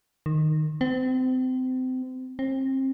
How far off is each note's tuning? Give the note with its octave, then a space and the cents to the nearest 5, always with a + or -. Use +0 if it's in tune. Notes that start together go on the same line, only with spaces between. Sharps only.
D#3 -10
C4 -30
C4 +30